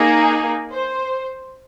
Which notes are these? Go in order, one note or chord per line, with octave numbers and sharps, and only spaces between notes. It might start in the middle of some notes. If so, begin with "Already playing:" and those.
Already playing: A#3 D#4 G#4
C5